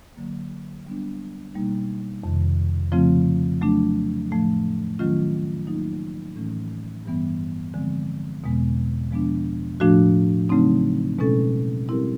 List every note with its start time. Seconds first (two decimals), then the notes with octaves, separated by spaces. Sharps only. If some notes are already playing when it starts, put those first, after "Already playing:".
0.17 D3 F#3 A#3
0.86 G3 B3 D4
1.54 B2 G3 A#3 D#4
2.24 F2 C3 D#3
2.92 C#3 F3 A3 C4 F4
3.61 F#3 A3 D4
4.30 A2 F3 A3
4.99 D#3 F#3 A3 C#4 F4
5.67 F#3 A#3 D#4
6.36 A2 E3 A3 C#4
7.06 G2 E3 G3 B3
7.74 D3 F3 G#3 C4
8.44 E2 B2 G#3 B3
9.11 F3 G#3 B3 D4
9.80 A2 F3 A3 D4 F#4
10.49 C#3 F#3 A3 C4 D#4
11.19 B2 G#3 C#4 E4 A4
11.88 G3 C4 E4 G4 A#4